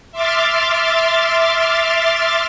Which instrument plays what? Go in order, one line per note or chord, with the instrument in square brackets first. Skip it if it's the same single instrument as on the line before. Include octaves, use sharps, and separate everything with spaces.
[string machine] E5 C6 D6 F6 A6